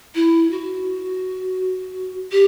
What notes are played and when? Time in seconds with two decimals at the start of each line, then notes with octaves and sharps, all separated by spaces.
0.15 E4
0.51 F#4
2.32 G4